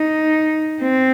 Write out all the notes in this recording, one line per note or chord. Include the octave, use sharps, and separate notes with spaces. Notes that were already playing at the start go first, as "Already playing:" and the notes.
Already playing: D#4
C4